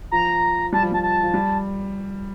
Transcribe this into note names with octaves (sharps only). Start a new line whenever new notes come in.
F3 A#5
G3 A5
F3
G3 A5
A5
F3
G3